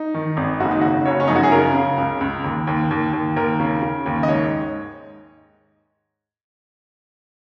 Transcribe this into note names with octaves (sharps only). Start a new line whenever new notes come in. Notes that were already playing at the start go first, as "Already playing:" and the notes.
Already playing: D#4
D#3
G#1
F#1 F#4
D#4
C#3 F#4
F#1 C#5
C#4
F#2 D#4
F#4
G#4
C#3 A#4
C#3
C#2
C#2
D#2
D#2
D#2
D#2
D#2 A#4
C#3
C#3
D#2
D#5
G#2 C#5